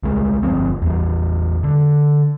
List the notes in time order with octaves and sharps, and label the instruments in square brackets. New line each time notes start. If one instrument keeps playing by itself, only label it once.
[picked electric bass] C#2 G3 G#3
G1 F3 C4
E2 G3
D3